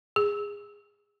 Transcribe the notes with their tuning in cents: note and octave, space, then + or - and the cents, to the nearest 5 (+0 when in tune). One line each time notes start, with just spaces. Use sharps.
G#4 -20